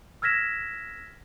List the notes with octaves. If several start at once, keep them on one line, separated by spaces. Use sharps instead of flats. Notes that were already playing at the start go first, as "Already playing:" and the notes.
E6 F6 G#6 A#6 B6 E7